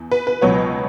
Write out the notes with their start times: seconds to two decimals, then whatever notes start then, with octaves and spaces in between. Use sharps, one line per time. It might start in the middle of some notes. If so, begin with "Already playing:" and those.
Already playing: E2
0.11 B4
0.27 B4
0.42 C#2 B2 F#3 B3 C#5